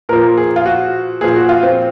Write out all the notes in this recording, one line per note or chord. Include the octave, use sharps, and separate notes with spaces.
A#2 F3 A#4
G#4
F4
F#4
A#2 F3 G#4
F#4
F4
C4